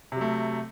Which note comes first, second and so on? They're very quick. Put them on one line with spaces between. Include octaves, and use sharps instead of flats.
C3 F#3 A3